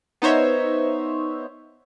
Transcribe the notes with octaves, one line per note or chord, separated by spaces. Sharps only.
B3 D#4 C5 C#5 E5